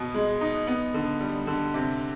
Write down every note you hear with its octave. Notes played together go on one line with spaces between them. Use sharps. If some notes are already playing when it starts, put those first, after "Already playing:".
Already playing: B2 B3
G#3
D#4
B3
D3
G3
D3
C3